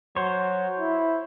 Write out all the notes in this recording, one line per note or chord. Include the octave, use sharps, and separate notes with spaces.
F#3 C5 C#5
E4